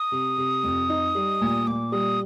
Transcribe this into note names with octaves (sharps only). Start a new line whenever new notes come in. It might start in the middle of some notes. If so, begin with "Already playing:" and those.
Already playing: D#6
C3
C3
F2
D#4
G3
A#2
A#2 D6
G3 D#6